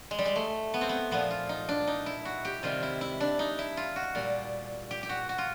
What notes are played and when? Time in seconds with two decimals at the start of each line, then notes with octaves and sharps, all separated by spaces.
0.11 G#3
0.19 G3
0.26 G#3
0.36 A3
0.74 B3
0.81 C4
0.89 B3
1.11 A#2 F3 B3
1.30 F4
1.49 D#4
1.69 D4
1.87 D#4
2.06 E4
2.25 F#4
2.45 G4
2.63 C3 D#3 G3 F4
2.83 E4
3.01 E4
3.20 D4
3.39 D#4
3.59 E4
3.77 F4
3.96 F#4
4.15 A#2 G3
4.91 G4
5.03 G4
5.09 F#4
5.29 F#4
5.38 F4